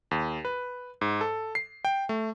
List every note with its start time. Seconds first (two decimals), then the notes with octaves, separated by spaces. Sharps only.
0.11 D#2
0.45 B4
1.01 G#2
1.21 A4
1.55 C7
1.85 G5
2.09 A3